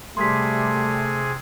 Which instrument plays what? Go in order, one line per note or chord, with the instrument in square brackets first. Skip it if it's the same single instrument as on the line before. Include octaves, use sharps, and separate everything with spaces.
[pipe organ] C3 G#4 [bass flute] G3 [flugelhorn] A3 [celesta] C6 B6